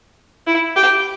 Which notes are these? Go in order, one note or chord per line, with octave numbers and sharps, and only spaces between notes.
E4
G4